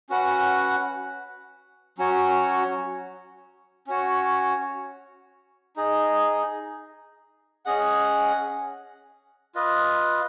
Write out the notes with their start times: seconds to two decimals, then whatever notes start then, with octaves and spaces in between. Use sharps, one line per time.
0.10 C#4 F#4 B4 F#5
1.98 F#3 C#4 F#4 C#5
3.87 C#4 F#4 C#5
5.76 D#4 G#4 D#5
7.66 C#4 G#4 D#5 F#5
9.55 F4 B4 D#5